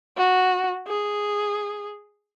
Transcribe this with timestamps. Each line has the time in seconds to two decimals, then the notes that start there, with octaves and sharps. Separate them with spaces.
0.17 F#4
0.88 G#4